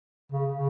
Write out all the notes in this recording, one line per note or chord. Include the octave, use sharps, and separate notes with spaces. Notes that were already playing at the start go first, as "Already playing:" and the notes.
C#3
C#3